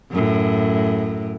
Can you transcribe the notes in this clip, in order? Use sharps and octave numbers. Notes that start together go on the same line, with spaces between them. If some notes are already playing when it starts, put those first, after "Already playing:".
F#2 A2